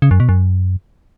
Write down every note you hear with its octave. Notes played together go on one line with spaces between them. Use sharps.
C#3
F#2
B2
F#2